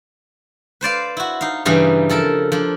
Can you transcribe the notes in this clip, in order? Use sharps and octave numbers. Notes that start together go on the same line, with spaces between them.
B4 C5 D5 F5
E4 F#4
D#4 F5
G2 C#3 E3 G3 D#4
F3 A4 A#4 A5
F3 D4